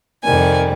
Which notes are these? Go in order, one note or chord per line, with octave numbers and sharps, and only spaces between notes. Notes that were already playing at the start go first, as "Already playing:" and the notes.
F2 C3 D#3 G3 G#5